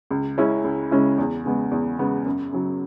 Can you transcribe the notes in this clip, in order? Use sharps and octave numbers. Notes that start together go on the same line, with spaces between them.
C#2
C#3 G#3 C#4 E4
C#2
C#3 G#3 C#4 E4
E2
C#3 G#3 B3
E2
C#3 G#3 B3
F#2
C#3 F#3